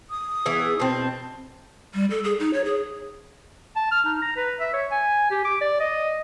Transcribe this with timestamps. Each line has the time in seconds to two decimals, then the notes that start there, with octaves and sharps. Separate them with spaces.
0.10 D#6
0.46 E3 B3 G#4
0.80 B2 C4 A5
1.94 G3
2.10 A4
2.24 G#4
2.40 D#4
2.53 C#5
2.65 G#4
3.76 A5
3.91 F6
4.05 D#4
4.22 A#5
4.37 B4
4.60 E5
4.73 C#5
4.91 G#5
5.31 G4
5.45 D6
5.61 D5
5.80 D#5